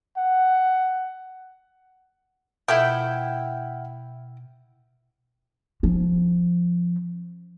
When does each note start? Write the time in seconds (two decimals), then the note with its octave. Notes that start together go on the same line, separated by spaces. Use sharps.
0.17 F#5
2.68 B2 F3 A3 E4 E5 F#5 G5 F6
5.83 F3 C#4